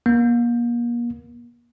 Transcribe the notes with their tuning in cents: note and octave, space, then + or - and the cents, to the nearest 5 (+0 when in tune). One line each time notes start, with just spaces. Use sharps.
A#3 +35